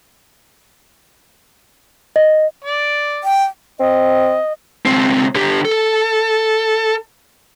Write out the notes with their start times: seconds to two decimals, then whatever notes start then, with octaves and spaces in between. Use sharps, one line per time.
2.16 D#5
2.64 D5
3.24 G5
3.80 C4 D#5
4.85 C#2 C4
5.35 D3 G4
5.65 A4